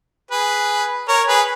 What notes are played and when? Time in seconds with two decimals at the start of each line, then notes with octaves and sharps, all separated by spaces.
0.31 G#4 B4
1.08 A#4 C#5
1.27 G#4 B4